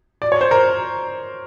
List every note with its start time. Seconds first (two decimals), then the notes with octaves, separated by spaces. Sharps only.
0.22 D5
0.32 C#5
0.41 C5
0.51 A#4